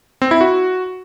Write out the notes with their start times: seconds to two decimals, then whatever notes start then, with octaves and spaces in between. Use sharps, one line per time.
0.22 C4
0.31 E4
0.41 F#4